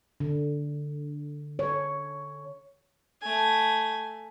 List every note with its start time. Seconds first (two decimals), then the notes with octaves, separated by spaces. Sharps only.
0.20 D3
1.59 C#5
3.22 A3 G#5